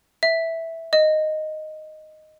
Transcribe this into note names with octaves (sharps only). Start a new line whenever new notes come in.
E5
D#5